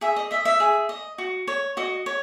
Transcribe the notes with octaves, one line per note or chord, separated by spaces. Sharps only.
G#4 E5
D#5
D#5 E5
E5
G#4
D#5
F#4
C#5
F#4 D#5
C#5